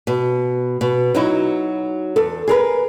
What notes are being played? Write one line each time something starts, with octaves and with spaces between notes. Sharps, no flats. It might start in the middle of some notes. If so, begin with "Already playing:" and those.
B2
B2
F#3 D#4 E4 F#4
E2 A4
G#4 A#4 B4